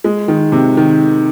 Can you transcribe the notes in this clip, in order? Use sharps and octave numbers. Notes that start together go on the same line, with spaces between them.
G#3
D#3
C3
D#3